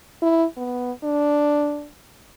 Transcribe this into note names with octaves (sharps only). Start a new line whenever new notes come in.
E4
B3
D4